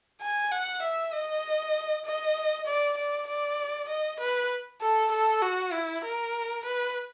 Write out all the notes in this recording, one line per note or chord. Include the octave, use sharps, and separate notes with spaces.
G#5
F#5
E5
D#5
D#5
D5
D5
D5
D#5
B4
A4
A4
F#4
E4
A#4
B4